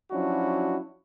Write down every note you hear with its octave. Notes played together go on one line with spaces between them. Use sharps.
F3 F#3 C#4 D4 E4 F#4